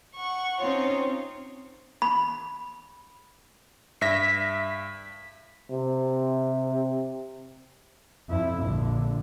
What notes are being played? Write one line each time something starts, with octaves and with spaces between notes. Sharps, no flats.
F#5 C#6
C4 C#4 D#4 F4 C#5
B5
G2 E5 A#6 B6
C3
F2 E4
A#1 D3